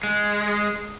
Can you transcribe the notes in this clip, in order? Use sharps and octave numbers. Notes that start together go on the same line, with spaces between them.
G#3